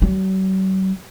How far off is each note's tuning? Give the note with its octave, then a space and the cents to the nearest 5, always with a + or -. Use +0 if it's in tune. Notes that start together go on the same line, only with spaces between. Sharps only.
F#3 +45